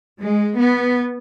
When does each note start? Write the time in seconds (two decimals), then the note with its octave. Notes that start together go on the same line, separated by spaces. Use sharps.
0.20 G#3
0.57 B3